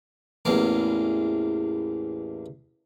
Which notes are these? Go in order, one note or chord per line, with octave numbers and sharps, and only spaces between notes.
A1 E2 A#3